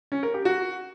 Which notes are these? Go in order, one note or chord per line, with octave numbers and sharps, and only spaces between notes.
C#4
A#4
G4
F#4